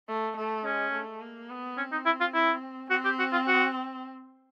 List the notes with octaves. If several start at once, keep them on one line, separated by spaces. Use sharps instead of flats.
A3
A3
G#3 C#4
A3
A#3
B3
C4 C#4
D#4
E4
F4
E4
C4 F#4
G4
F#4
F4
F#4